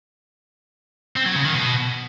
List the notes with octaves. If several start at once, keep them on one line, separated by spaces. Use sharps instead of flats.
C4
F#3
C#3
D#3
B2